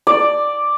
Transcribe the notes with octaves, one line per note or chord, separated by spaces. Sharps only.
D5